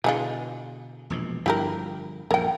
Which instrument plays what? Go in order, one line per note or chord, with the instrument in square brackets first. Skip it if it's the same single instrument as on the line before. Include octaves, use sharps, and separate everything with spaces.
[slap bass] B2 D3 [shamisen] E3 G#3 F4
[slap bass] E1 A#1 B2
[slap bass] G1 G2 F3 [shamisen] E4 G4 A#4
[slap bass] A#1 F#2 [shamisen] A#4 G5